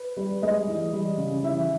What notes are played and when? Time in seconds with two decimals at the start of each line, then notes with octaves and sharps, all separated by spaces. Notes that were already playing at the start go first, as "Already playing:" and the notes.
Already playing: B4
0.17 G3
0.42 G#3 D#5
0.68 E3
0.93 G3
1.18 C#3
1.43 E3 E5